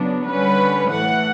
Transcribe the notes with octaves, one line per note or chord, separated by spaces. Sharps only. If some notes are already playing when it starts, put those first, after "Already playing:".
Already playing: C#3 F#3 B3 D4
D3 G3 C#4 B4
A2 E3 A3 F#5